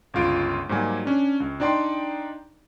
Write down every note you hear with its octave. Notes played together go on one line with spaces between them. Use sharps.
G1 C#2 F4 D7
G#2 F#3 G3 A#3 G#5
C#4 D4
C#2
D4 D#4 D5 G5 C6